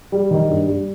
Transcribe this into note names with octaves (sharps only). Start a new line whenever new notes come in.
G3
D#3
G2
G3